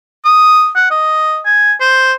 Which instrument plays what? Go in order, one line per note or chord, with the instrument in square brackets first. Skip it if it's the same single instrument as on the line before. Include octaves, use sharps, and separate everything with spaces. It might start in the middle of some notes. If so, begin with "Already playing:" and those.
[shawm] D#6
F#5
D#5
G#5
C5